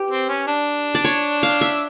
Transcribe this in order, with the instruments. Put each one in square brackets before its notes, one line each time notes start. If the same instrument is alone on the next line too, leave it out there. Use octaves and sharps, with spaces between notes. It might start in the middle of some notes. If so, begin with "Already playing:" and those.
Already playing: [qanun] G4 B4
[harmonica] C4
C#4
D4
[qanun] D5
C#5
F5
E5